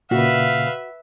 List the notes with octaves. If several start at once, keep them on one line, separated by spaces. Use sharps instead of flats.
A#2 C#3 F#4 B4 E5 F5